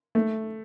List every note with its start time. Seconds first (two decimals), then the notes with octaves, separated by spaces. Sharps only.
0.15 A3